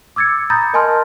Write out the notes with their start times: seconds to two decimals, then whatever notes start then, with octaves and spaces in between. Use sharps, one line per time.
0.16 D6 E6 G#6 A6 C#7
0.50 A#5 B5 D#6 G6 A6 A#6
0.74 A#4 D#5 G#5 A5 C6 F6